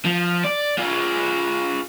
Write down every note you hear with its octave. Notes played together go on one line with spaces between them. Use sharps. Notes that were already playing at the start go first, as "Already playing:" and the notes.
F3
D5
F4 G#4